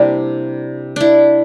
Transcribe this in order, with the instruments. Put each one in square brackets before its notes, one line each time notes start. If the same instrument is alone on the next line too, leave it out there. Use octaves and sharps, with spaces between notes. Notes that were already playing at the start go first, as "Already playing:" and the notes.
Already playing: [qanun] C3 G3 A#3 D4 E4
D4 E4